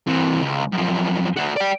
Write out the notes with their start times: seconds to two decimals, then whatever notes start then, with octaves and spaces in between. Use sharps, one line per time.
0.08 C3 E3
0.42 C#2
0.73 F#2 F3
1.36 A3 F#4
1.56 D5 G5